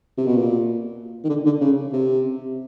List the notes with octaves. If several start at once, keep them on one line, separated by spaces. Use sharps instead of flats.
C3
B2
A#2
D#3
D3
D3
C#3
C3